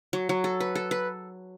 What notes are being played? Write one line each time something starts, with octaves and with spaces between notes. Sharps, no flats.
F#3
F#3
A4
B4
A4
B4